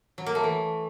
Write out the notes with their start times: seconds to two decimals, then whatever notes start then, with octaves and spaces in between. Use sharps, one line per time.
0.18 F#3
0.26 A#3
0.35 A3
0.44 E3